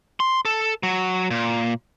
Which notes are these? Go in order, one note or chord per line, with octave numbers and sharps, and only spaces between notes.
C6
A4
F#3
A#2